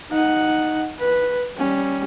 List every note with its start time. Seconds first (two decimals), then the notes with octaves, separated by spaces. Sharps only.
0.10 D#4 F#5
0.99 B4
1.57 G3 C#4